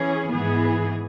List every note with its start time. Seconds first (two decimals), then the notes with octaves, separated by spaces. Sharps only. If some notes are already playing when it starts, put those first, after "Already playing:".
Already playing: E3 C#4 G#4
0.32 G#2 E3 B3 G#4